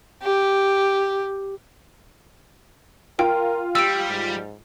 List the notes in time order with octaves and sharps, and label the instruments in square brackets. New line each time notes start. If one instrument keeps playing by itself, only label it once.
[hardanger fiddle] G4
[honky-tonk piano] F4 [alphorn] A#4 [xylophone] G5
[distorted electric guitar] G3 [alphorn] G4 [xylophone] E6 D7
[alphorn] G#2